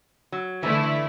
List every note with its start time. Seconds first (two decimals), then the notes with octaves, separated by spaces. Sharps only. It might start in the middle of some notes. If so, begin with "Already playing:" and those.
0.32 F#3
0.63 D3 E3 A3 E4
0.83 E3